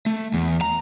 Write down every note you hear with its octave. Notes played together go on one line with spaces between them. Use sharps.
A3
E2
A#5